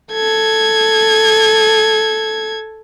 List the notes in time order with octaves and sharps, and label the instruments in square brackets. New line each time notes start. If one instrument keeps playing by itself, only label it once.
[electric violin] A4 G#6